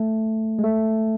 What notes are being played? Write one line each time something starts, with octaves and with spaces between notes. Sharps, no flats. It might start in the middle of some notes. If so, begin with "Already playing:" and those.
Already playing: A3
G#3
A3